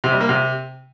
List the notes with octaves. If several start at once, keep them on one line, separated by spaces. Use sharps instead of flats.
C3
G3
A#3
C3